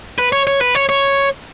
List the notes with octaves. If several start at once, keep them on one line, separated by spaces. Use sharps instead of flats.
B4
C#5
C#5
B4
C#5
C#5